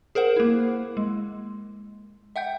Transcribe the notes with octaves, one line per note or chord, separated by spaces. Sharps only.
G#4 A#4 C5 F#5
A#3 E4
G#3
E5 F#5 G5 G6